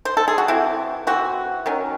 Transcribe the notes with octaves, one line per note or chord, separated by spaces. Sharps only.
C5
A4
G#4
F#4
E3 C4 E4
E3 C4 F#4
D#3 F#3 C#4